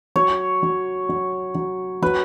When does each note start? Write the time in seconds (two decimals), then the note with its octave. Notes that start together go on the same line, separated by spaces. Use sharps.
0.16 F#3 C#5
0.63 F#3
1.09 F#3
1.55 F#3
2.02 F#3 B4